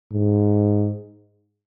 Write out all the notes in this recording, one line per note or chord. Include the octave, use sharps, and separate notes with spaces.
G#2